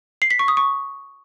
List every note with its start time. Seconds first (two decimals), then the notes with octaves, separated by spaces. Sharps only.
0.22 C7
0.31 B6
0.39 C#6
0.48 D#6
0.57 C#6